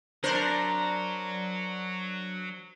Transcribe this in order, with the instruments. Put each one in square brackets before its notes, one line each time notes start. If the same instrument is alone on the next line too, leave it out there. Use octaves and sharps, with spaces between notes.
[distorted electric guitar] F#3 [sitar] D4 A#4 C5